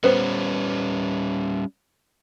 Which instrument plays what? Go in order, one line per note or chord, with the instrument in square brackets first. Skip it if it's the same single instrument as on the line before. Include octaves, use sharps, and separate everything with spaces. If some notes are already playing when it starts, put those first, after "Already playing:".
[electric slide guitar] G3 C#4 [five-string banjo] B3 C5